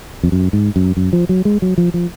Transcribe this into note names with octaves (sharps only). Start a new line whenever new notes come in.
F2
F#2
G#2
F#2
F#2
F3
F#3
G#3
F#3
F3
F3